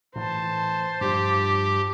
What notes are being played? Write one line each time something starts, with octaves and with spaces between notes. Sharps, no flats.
A2 E3 C5 A5
G2 F3 G4